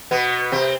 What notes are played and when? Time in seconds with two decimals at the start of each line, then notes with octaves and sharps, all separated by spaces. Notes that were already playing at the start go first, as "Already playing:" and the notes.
0.11 B2 B3
0.52 C3 C4